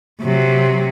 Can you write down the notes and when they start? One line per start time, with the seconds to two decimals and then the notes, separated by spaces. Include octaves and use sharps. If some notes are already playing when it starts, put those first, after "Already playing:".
0.21 C3 F#3